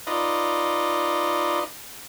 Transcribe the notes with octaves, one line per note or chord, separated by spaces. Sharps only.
D#4 F4 B4 D5 D#5